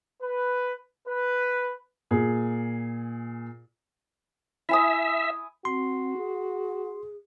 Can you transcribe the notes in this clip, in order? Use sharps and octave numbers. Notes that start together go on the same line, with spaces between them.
B4
B4
A#2 G#4
E4 E5 G#5 D#6
C4 F#4 C6
G#4